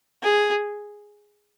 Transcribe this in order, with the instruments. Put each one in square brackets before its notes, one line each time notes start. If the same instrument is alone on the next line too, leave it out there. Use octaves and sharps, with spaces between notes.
[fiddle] G#4